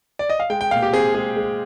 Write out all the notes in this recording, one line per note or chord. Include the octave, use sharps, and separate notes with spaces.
D5
D#5
F5
G#3 G5
G5
A#2 F5
G4
C4 G#4
G#3 G#4
G#3